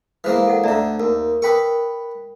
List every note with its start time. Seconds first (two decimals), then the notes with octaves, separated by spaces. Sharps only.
0.24 E3 G#3 A#3 B4 C5
0.47 A4 F#5
0.64 D2 D3 D5 E5 A#5
1.00 D#2 A#4
1.42 A#4 B4 G5 B5 C#6 D#6